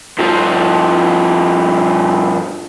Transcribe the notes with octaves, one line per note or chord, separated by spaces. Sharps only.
G2 F3